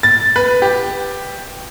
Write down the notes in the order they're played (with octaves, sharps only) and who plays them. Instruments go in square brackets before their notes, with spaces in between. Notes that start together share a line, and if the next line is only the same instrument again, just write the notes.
[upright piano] A6
B4
G4